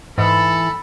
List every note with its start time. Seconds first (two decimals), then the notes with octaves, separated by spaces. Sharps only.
0.18 G#2 E3 A4 B5